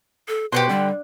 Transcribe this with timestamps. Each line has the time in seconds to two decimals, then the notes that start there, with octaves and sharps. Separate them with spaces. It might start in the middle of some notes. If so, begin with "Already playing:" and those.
0.28 A4
0.52 B2 G4 B4 C5 F#5 C6
0.69 D3 G3